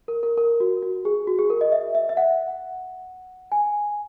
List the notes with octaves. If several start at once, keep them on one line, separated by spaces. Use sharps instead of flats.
A#4
A#4
A#4
F#4
F#4
G#4
F#4
G#4
A#4
D#5
E5
E5
E5
F#5
G#5